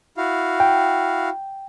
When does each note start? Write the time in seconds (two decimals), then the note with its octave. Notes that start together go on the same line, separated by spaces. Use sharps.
0.17 E4 F#4 F5
0.60 G5